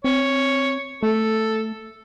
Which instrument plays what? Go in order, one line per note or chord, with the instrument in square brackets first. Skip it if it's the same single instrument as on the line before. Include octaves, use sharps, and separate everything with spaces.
[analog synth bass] C4 [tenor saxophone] C#5
[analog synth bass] A3 [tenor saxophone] A4